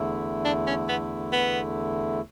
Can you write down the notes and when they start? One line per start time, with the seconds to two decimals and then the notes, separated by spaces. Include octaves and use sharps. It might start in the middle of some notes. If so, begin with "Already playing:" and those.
Already playing: E2 D3 A3 E4
0.45 D4
0.67 C#4
0.89 B3
1.33 B3